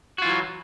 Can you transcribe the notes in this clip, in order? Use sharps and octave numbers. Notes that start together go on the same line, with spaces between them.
E3 F#3 F4 F#4